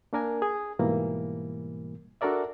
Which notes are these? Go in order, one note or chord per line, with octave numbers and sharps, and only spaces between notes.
A#3 D4 A#4 G#5
G#4
G#2 B2 E3 G3 A#3
D4 F#4 A4 A#4 D5 E5